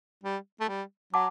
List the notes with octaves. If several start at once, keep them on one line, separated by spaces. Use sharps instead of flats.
G3
A3
G3
F#3 F#5 A5 D6